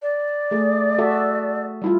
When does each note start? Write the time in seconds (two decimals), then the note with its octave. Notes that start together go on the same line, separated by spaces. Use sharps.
0.02 D5
0.51 A3 G#4
0.98 F#4 A4 E5
1.82 G3 E4 F4